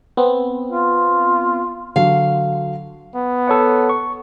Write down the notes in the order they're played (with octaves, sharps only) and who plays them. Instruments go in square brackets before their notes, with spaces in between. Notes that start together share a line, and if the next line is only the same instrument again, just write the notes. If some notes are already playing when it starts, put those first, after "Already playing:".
[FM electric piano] B3 C4
[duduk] F4
[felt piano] D3 F#3 [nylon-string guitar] F5
[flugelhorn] B3
[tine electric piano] A4 C#5 F#5
C#6